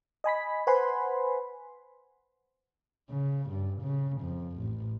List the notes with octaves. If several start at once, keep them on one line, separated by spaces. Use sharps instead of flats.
D#5 G#5 B5 B6
B4 C5 F#5 G#5 B5 C6
C#3
G2
C#3
F2
A1